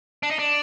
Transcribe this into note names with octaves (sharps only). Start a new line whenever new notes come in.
D4
D#4
D4